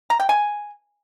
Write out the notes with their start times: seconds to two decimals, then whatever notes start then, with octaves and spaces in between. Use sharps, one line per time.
0.10 A#5
0.20 G5
0.29 G#5